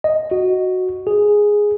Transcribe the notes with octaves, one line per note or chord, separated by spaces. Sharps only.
D#5
F#4
G#4